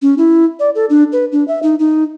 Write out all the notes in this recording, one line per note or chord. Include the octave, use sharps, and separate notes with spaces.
C#4
E4
D5
A4
D4
B4
D4
E5
D#4
D#4